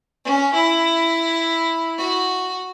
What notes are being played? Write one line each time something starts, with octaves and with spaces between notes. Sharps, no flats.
C#4
E4
F#4